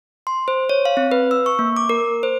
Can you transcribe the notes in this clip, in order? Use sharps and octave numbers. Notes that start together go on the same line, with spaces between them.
C6
C5
C#5
F5
C4
B4
E6
C#6
A#3
D6
A#4
C5